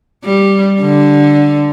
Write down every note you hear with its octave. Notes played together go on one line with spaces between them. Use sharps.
G3
D3